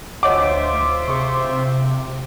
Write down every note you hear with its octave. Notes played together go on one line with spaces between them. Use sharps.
D2 F4 C5 C#5 D#5 E5 F#5 D6
C3 G#4 C#6